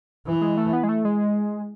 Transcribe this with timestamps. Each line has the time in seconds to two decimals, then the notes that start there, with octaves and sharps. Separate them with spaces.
0.26 E3
0.41 G#3
0.57 A3
0.73 B3
0.83 G#3
0.89 A3
1.05 G#3